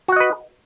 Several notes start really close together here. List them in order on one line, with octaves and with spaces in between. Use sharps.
F#4 F#5 D#5 B4